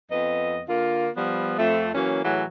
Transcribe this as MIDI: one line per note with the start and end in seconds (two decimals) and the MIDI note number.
0.11 0.62 41
0.11 0.62 59
0.11 0.62 75
0.68 1.09 50
0.68 1.09 58
0.68 1.09 65
1.16 1.57 53
1.16 1.57 55
1.16 1.57 59
1.58 1.91 41
1.58 1.91 57
1.95 2.24 52
1.95 2.24 54
1.95 2.24 58
1.95 2.24 61
2.24 2.44 45
2.24 2.44 52
2.24 2.44 54
2.24 2.44 68